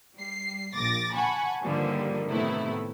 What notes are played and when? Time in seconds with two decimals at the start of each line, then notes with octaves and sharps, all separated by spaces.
0.16 G3 C7
0.74 A#1 A#2 D6 A6 A#6
1.15 F#5 G#5 A5 B5 C#6
1.63 G2 D3 D#3 F3 G3 A#3
2.28 A2 C3 D#3 A3 B3 E4